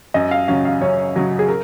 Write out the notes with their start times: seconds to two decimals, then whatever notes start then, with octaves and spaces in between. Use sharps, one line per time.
0.14 F#2 D#5
0.31 F5
0.48 C#3 F#3 C#4 F5
0.65 F5
0.81 F#2 C#5
1.16 C#3 F#3 C#4
1.39 G#4
1.48 A#4